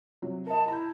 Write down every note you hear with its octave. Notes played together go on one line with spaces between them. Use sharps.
C3 F#3
A#4 D#5 A5
E4 A#5 G6